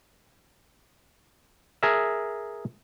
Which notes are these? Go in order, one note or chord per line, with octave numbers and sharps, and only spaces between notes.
G#4 A#4 E5